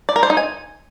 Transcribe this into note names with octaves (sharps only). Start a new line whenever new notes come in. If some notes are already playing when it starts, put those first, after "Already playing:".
D5
A#4
C5
D#4
G#5